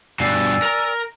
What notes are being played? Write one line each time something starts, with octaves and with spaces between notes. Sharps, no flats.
G2 B2 D5 G#5 E6
A#4 A#5